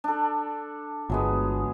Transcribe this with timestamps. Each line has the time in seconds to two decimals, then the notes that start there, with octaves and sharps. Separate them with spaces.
0.04 D4 A4
1.10 G1 F#3 G#3 B3